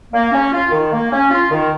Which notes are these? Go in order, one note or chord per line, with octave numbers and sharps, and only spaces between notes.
A#3
C#4
F4
D#3
A#3
C#4
F4
D#3